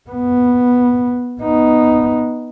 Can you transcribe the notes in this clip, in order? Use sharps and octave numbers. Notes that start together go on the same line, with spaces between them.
B3
B3 D#4